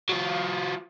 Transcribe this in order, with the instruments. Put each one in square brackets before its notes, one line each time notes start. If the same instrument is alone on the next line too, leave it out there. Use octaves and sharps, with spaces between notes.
[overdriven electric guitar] F#3 F4